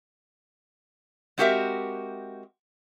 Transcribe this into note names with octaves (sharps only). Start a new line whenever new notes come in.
G#3 C4 F#4 G4 A#4 E5